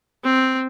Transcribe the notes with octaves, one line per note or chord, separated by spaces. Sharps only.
C4